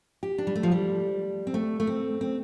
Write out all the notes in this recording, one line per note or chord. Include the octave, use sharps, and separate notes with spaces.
G4
D4
G3
A3
F3
G3
C4
A3
A3
C4
C4